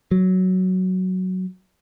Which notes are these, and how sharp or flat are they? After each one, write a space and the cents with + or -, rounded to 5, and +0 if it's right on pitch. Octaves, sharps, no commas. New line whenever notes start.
F#3 +5